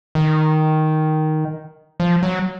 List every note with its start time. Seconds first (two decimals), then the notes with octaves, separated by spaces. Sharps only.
0.15 D#3
2.00 F3
2.23 F#3